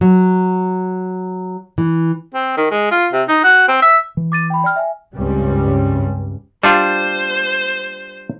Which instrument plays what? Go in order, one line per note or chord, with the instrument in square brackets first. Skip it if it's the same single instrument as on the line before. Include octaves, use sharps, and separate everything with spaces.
[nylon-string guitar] F#3
E3
[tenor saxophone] C4
D#3
G#3
F4
C3
D#4
F#4
C4
E5
[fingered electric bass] E3
[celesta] D6 A6 D#7
G5 B5
D5 G5 F6
E5 G#5
[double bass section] C#2 G2 G3 C4 C#4
[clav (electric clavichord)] G3 D4 F4 [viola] C5